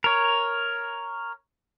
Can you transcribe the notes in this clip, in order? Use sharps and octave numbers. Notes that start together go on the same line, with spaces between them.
A#4 C#5